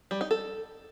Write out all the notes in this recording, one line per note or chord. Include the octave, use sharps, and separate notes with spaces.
G3
D#4
A4